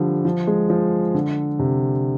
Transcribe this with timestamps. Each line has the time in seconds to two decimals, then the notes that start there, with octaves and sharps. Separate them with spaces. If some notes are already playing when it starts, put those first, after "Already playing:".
Already playing: D3 F3 G3
0.25 F3
0.47 G#3
0.70 F3
1.14 D3
1.59 C3